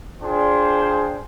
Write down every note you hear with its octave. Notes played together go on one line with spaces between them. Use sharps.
D4 F4 G#4 C5 G5 C6